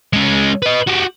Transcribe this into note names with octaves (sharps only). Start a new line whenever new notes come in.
G#3 C#4
B4 D#5
F#4 G4